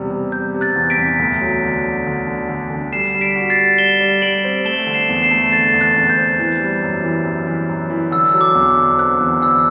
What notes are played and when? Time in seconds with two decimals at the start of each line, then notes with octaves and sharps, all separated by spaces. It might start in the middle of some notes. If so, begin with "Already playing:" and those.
Already playing: E2 C3 G3
0.11 C3
0.32 G3 G6
0.54 C3
0.61 F#6 A6
0.76 E2
0.90 B6 D7
0.97 E2
1.19 D2
1.41 F#3
1.63 D3
1.84 D3
2.06 D3
2.27 D3
2.49 D3
2.70 D3
2.93 G3 C7 E7
3.15 G3
3.21 B6 D7
3.36 F#4
3.50 A6 C7
3.57 G3
3.78 G3 E7 G7
4.00 G3
4.22 G3 D7 F#7
4.44 C4
4.65 A3 E7 G7
4.87 D3
4.94 C7 E7
5.09 E2
5.23 C7 E7
5.31 A3
5.52 D3 A6 C7
5.74 E2
5.81 F#6 A6
5.96 E2
6.10 G6
6.17 C4
6.39 E3
6.60 G3
6.82 F#2
7.04 E3
7.25 F#2
7.46 E3
7.69 F#2
7.90 E3
8.12 D3 E6
8.34 F#3
8.41 D6
8.55 E2
8.77 D3
8.98 C4 F#6
9.20 E2
9.42 D3 E6